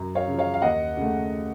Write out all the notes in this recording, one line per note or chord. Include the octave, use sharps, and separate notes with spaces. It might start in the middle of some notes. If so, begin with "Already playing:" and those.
Already playing: F#2
C#5 F5
C#3 F3
C#5 F5
F5
D#2 D#5 F#5
C#3 A3